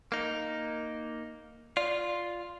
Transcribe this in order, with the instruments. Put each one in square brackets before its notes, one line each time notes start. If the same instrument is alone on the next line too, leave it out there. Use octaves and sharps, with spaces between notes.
[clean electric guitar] A#3 D#4
[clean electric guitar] F4 [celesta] D5